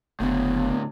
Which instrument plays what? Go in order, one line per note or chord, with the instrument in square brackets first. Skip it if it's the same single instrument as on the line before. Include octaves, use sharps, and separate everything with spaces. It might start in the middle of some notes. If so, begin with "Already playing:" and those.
[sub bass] F#1 [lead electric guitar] A2 D3 [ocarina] B3